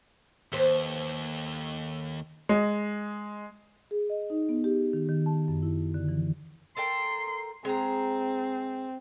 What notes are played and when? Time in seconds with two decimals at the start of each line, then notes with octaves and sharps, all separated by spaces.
0.52 D#2 A4 B4 C5
2.49 G#3
3.91 G#4
4.10 D#5
4.30 D#4
4.49 B3
4.64 G4
4.93 D#3
5.09 D#3
5.26 A5
5.48 F#2
5.62 E4
5.94 D3
6.09 E3
6.77 A4 A#4 G5 C6
7.65 G#3 C4 A#5